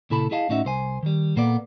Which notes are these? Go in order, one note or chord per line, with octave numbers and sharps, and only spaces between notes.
A#2 C#3 E4 A4 A5 B5
E4 G#4 D#5 F5 A5
A2 C#4 D#4 F#4 E5
C2 C5 G#5
D#3 G3
A#2 A#3 B3 A4 D5